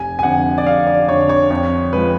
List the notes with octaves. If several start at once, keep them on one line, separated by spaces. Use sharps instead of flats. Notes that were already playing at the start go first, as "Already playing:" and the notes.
Already playing: F1 G#5
G#5
F2 D3 F#5
D5
F1 F5
D5
F2 D3 C#5
C#5
F2 C#5
F3 G#3 B4